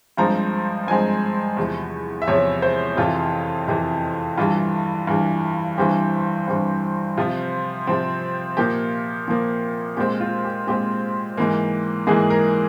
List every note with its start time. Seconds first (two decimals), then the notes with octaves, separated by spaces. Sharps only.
0.17 G2 F3 G#3 C4 A#5
0.87 G2 F3 G#3 C4 G#5
1.57 E2 C3 F3
2.22 E5
2.27 E2 C3 F3 C#5
2.62 C5
2.97 F2 C3 E3 F4
3.68 F2 C3 E3
4.38 G2 E3 G3 F4
5.07 G2 E3 G3
5.77 G2 E3 G3 C4 G4
6.48 G2 E3 G3 C4
7.17 C3 F3 C4 F4
7.87 C3 F3 C4
8.57 A#2 F3 A#3 G4
9.28 A#2 F3 A#3
9.97 A#2 G#3 C4 G4
10.20 F4
10.45 G4
10.67 A#2 G#3 C4 G4
11.37 G#2 E3 A#3
12.07 G#2 E3 A#3 G#4
12.30 A#4